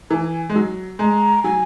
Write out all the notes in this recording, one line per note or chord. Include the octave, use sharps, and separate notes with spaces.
E3 G#5 A#5
G#3
F#3
G#3 A#5
F#3 G#5